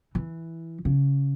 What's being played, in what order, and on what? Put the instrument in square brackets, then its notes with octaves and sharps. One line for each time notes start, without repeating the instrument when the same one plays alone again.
[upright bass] E3
C#3